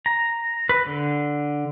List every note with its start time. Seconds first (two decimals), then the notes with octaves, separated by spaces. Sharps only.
0.06 A#5
0.69 B4
0.86 D3